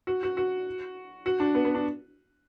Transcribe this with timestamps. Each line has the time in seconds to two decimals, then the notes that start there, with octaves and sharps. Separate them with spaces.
0.07 F#4
0.23 F#4
0.37 F#4
1.26 F#4
1.40 D4
1.55 B3
1.65 B3
1.75 D4